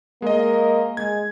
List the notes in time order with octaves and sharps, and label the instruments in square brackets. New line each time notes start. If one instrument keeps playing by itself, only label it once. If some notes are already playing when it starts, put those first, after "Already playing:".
[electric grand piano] G#3 D#5 [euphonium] A#3
[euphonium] G#3 [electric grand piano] G#6